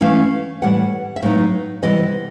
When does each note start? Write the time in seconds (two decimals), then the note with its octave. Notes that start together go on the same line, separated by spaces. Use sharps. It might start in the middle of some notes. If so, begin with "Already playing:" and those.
0.01 E3 A3 C#4 E4 F5
0.62 A2 E3 G3 B3 F#5
1.16 E5
1.22 A2 F#3 B3 D#4 F5
1.83 C3 E3 G3 B3 D#5